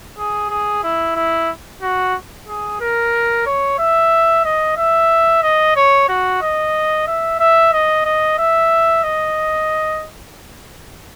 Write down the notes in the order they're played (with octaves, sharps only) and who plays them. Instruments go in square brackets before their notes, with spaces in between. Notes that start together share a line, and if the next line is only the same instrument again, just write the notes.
[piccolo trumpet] G#4
G#4
E4
E4
F#4
G#4
A#4
C#5
E5
D#5
E5
D#5
C#5
F#4
D#5
E5
E5
D#5
D#5
E5
D#5